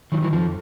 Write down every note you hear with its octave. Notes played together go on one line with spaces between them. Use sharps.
D#3 E3 F#3
E3 F#3
F2 F3